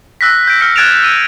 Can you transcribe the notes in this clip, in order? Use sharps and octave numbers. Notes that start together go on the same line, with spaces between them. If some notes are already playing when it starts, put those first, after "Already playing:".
E6 F#6 A#6 B6
G6 D7
F6 B6 C#7
F#6 G#6 A6 D7 E7 F7
E6 D#7